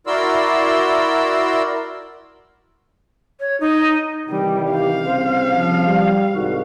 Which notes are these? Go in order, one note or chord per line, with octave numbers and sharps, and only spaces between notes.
E4 F#4 A#4 D5 C6 E6
C#5
D#4
C3 D#3 E3 G3 G4
F5
C2 C#3 C4 C5
F3
G3
C2 G#2 D#3 F#4